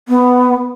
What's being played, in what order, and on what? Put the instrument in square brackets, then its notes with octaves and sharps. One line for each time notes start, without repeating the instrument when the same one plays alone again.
[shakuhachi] B3